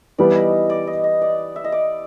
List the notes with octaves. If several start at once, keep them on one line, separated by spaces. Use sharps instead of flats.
E3 G3 B3 D5
D#5 E5
D5
D#5
D#5
D5
E5
D#5
D5